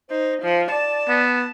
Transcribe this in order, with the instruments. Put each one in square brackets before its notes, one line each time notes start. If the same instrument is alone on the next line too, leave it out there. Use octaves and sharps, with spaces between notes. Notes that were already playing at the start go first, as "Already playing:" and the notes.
[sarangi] D#4 [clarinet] C5
[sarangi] F3 [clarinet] C5
[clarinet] D5 [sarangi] A5
[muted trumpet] B3